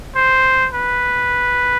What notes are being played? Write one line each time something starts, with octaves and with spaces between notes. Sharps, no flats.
C5
B4